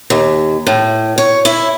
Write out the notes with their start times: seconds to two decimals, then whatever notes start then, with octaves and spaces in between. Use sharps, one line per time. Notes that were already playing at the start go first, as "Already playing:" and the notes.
0.10 D#2
0.67 A2
1.18 C#5
1.45 E4